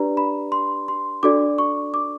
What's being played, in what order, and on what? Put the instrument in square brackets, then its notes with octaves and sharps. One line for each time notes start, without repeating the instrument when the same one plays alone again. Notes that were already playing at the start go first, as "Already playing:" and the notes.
Already playing: [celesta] D4 G4 B4 D5 A#5
B5
C6
C6
D4 F#4 A4 D5 D6
C#6
D6